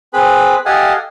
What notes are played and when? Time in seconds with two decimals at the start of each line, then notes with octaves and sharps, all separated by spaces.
0.13 C4 G#4 B4 B5
0.66 G4 A4 D#5 F5 F#5 G#5